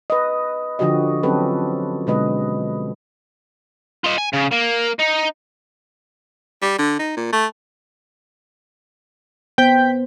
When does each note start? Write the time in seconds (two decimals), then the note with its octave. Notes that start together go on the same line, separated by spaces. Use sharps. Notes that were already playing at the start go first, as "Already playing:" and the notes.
0.10 B4 D#5
0.79 D3 F3 F#4 G4 D#5
1.23 F#3 C4 C#4 G4 A4 B4
2.07 B2 D3 G#3 B4 D#5
4.04 F4 D#5
4.18 G#5
4.34 C#3
4.52 A#3
4.99 D#4
6.62 G3
6.78 D3
6.99 D#4
7.17 A#2
7.33 A3
9.58 B3 C5 G5 G6 B6